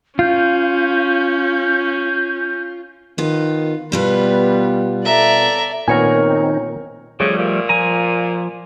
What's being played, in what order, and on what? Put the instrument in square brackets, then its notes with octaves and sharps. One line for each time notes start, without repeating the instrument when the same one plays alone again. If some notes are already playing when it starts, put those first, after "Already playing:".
[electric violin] C#4 [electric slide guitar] F4 [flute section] G6
[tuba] D#3 [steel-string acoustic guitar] B3 F4
[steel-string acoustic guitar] B2 B3 F4 [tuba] G3 [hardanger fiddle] B4
[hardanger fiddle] A4 D5 [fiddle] E5 A#5
[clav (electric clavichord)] A#2 B3 [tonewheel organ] D#3 C4 D#4 [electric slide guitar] A#4 C#5 G#5
[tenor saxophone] C#3 [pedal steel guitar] F3 G3 A3
[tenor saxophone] A#2
[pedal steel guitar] F3 G#5 A#5